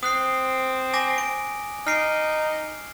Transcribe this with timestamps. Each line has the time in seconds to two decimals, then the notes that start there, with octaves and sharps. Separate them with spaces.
0.03 C4 D#6 F#6 C7
0.94 G#5 D6 A#6
1.18 D7
1.87 D#4 F6 C7 D7